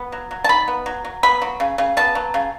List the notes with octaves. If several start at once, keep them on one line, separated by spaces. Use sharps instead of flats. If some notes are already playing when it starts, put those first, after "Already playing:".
Already playing: B3
F#3
F#3
A5
D#4 B5
B3
F#3
F#3
B3 B5
F#3
C#3
C#3
B3 A5
F#3
C#3